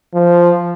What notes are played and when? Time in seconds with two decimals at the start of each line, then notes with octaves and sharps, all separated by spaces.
0.14 F3